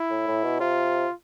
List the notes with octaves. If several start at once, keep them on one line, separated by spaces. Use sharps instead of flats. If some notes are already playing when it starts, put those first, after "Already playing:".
Already playing: E4
A2
A2
B2
C3 F4